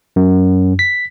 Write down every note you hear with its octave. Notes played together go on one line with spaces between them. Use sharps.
F#2
B6